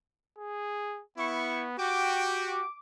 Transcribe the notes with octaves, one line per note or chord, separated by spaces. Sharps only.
G#4
B3 E4 C#6
F#4 G4 G5 D6